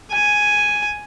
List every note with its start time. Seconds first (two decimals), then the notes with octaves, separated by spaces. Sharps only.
0.11 G#5